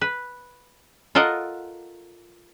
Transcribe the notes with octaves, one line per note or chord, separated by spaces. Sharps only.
B4
F4 A4 A#4 D#5 F#5